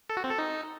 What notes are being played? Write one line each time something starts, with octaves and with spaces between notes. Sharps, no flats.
A4
F#4
C4
A4
D#4